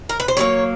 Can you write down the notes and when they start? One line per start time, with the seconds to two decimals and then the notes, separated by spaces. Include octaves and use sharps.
0.09 A#4
0.20 B4
0.28 C5
0.37 D3 F#3 A#3 C#5